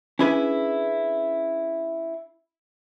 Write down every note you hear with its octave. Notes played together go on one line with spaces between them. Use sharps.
C#4 D4 E4 G#4 B4 G#5